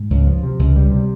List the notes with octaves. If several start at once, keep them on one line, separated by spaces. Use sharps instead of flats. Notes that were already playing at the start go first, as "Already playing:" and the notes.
Already playing: G#2
C#2
F3
C3
C#2
G3
C3